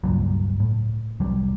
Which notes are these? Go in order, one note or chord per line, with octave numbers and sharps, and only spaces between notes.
C#2 G2 A#2 F#3
A2
C2 F2 F#3 G3